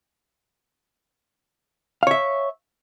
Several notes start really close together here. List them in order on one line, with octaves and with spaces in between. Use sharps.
F5 C#5 E5